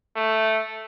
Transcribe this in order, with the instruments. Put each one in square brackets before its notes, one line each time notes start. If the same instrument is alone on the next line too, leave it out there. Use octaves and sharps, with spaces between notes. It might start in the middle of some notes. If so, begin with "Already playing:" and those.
[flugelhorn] A3